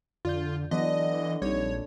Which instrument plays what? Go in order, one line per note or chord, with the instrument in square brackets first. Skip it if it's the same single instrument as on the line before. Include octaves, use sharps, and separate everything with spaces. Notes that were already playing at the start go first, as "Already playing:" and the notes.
[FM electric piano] F2 D5 G6 [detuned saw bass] D3 [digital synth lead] F4
[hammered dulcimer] D3 [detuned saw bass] E3 [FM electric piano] F#3 B3 [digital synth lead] D#5
[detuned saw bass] A#1 [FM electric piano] G3 C4 D#4 [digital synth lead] C#5